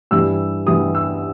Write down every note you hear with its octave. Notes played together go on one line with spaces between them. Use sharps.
G2 E3 G3 E6
G2 E3 G3 D#6
E6